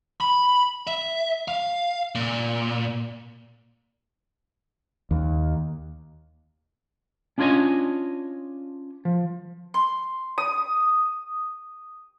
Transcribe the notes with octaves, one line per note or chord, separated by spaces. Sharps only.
B5
E5
F5
A#2
D#2
C#4 D4 F4 C#5 D#5 G#5
F3
C6
D#6